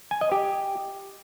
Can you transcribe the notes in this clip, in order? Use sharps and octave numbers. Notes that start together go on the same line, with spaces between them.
G#5
D#5
G4